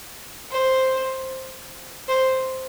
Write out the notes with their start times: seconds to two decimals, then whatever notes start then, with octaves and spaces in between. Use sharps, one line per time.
0.51 C5
2.08 C5